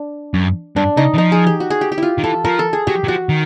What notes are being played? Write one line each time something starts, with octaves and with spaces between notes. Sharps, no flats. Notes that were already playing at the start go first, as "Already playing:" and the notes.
Already playing: D4
F#2
G2 D4
C#3 D#4
E3
F3 D#4
G#4
G4
F#4
G#4
G4
G4
E4 F4
D#3
E3 A4
F3 A#4
A4
G#4
F#3 G4
F#3
F3 F#4
D#3